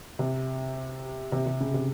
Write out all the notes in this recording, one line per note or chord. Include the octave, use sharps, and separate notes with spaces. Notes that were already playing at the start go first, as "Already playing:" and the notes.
C3
C3
C3
C#3
C3